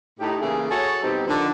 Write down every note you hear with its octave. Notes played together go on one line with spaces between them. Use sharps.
A2 D#4 G4
C#3 E3 A3 A#3 E4 G#4
F#4 G#4 A4 C#5
B2 G3 C4 D#4 G4
D3 D#3 F3